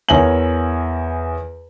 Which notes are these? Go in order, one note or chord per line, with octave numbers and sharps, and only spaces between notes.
E2 A#4 C#5 E5 G#5 F#7